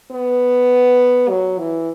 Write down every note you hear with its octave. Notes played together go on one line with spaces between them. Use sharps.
B3
F#3
E3